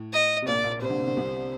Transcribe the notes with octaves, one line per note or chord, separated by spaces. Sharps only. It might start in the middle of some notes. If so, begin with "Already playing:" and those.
Already playing: A2
D#5
C3
A#1 A#2 D5
A#1 A#2
C3 C5
D3
C3
D3
C2 C3